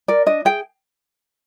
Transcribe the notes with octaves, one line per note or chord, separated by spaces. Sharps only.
A#4 D5
D4 D#5
G#4 G5